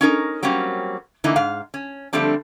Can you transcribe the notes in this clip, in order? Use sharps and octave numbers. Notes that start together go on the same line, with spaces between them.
C#4 D#4 A#4
F#3 G3 A#3 C4 C#4
D3 E3 A3 A#3 D#4 E4
G#2 F5
C#4
D3 F3 G3 A3 C4 D4